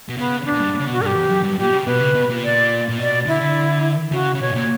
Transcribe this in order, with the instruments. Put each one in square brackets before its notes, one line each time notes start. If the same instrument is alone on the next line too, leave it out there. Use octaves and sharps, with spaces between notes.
[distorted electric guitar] B2
[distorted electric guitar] C#3 [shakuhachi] B3
[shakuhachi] D4
[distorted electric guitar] A#2
G2
C#3
[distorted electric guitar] B2 [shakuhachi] F#4
[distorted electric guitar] G2 [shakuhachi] G4 A#4
[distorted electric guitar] E2
F#2
G2
[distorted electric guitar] A#2 [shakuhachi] G4
[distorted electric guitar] B2
C#3
[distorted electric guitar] B2 [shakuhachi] B4
[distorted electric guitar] C#3
B2
A#2
[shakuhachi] D5
[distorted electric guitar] A#2
[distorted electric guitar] B2 [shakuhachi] D5
[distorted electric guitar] D3 [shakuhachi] E4
[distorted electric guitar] D3
[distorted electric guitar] C#3 [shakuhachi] F#4
[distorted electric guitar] C#3
[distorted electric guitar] B2 [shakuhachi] C#5
[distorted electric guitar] G2
A#2